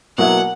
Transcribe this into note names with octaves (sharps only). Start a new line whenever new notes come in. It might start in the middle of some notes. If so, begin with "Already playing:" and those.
B2 F#3 A#3 E4 F#5